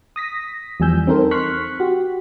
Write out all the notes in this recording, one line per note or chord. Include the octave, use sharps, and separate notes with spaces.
D#6 A#6 B6
E2 F3 G3 G#5 E6 G6
C4 D#4 A4 A#4 C5
C6 C#6 F6 F#6 B6
F#4 G4